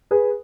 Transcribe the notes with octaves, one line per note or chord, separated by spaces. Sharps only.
G#4 B4